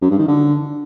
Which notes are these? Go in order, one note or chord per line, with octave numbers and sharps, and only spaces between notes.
F#2
G2
D#3
D3